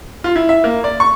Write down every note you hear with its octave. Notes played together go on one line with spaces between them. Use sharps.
F4
E4
E5
A#3
D5
C#6